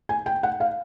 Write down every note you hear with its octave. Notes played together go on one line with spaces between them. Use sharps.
G#5
G5
F#5
F5